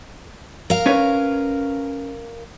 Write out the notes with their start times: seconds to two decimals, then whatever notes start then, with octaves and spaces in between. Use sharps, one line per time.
0.70 A#4 F5
0.86 C#4 B4 C#5